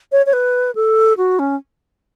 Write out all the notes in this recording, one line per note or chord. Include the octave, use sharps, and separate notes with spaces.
C#5
C#5
B4
A4
F#4
C#4